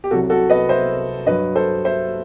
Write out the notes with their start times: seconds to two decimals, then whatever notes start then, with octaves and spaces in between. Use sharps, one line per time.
0.04 G4
0.11 C2 C3 F#3 F#4 A4
0.30 F#4 A4
0.50 B4 D#5
0.69 C5 E5
1.26 G2 F#3 B4 D#5
1.55 A4 C5
1.85 C5 E5